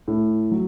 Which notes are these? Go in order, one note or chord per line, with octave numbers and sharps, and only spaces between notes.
A2
F#3